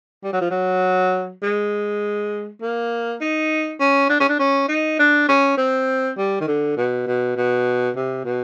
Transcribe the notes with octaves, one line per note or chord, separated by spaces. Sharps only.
G3
F#3
F3
F#3
G#3
A#3
D#4
C#4
D4
C#4
D4
C#4
D#4
D4
C#4
C4
G3
D#3
D3
B2
B2
B2
C3
B2